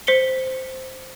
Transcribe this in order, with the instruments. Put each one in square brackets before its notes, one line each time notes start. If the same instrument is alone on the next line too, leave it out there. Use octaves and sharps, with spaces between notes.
[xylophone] C5 B6 C#7 G7